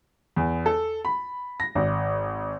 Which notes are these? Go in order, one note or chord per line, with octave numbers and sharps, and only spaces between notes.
E2
A4
B5
A#6
G#1